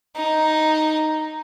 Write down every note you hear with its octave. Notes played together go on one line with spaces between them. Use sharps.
D#4